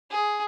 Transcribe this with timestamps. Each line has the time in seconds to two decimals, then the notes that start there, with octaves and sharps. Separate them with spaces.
0.10 G#4